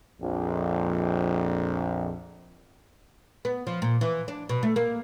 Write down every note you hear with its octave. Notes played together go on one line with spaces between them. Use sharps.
A#1 F2
B3
F3
A#2
E3
D4
B2
A3
A#3